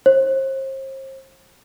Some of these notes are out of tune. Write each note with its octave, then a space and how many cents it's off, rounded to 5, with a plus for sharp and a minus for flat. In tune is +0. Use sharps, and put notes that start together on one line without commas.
C5 +40